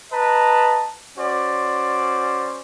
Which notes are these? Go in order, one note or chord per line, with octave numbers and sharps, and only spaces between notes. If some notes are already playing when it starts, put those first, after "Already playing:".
B4 D#5 A5 A#5
C#4 F#4 C5 D5